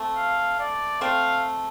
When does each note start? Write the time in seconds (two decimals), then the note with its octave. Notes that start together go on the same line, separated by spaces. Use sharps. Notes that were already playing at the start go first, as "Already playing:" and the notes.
Already playing: A3 C4
0.16 F5
0.59 D5
1.01 A3 C4 F5